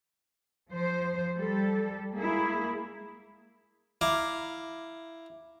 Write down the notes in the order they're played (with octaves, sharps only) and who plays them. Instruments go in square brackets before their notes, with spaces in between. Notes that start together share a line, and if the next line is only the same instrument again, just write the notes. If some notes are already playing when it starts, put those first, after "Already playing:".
[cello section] F3 C5
G3 A4
G#3 A#3 E4 G#4
[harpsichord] E4 F5 A#5 D6